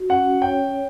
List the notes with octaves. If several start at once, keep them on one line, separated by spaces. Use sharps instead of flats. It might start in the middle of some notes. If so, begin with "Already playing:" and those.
Already playing: F#4
C#4 F#5
C#5 G5